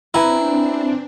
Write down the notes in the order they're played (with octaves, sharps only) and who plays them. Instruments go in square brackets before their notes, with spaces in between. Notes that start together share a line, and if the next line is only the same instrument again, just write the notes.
[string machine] C4 D4 [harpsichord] E4 [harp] B4 G#5 A#5